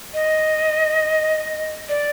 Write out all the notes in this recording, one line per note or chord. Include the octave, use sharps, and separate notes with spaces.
D#5
D5